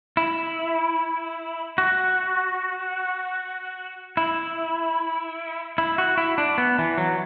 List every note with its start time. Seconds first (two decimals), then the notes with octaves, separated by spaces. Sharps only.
0.17 E4
1.78 F#4
4.17 E4
5.78 E4
5.98 F#4
6.17 E4
6.38 D4
6.58 B3
6.78 E3
6.98 F#3